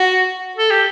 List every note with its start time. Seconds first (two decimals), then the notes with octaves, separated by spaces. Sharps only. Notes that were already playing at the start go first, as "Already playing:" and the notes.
Already playing: F#4
0.57 A4
0.71 G4